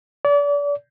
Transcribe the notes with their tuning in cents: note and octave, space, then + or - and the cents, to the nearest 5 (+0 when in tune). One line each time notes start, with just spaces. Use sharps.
D5 -35